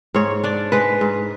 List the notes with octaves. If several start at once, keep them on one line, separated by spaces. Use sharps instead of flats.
G#2 C#5
D4 D5
G#3 B4
G#2